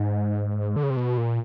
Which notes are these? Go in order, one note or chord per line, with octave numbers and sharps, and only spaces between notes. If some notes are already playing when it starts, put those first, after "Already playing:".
Already playing: G#2
D3
C#3
C3
B2
A#2